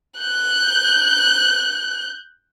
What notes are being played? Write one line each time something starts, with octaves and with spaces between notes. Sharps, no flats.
F#6 G6